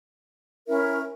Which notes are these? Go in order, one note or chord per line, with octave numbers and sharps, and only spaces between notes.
C#4 E4 A#4 E5